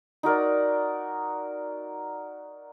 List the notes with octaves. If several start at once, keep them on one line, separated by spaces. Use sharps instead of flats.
D#4 F#4 A#4 D5